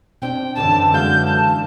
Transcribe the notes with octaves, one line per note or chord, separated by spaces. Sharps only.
B2 C4 D4 G5
F#2 D3 E3 A5
G#3 F#4 F5 G6
A5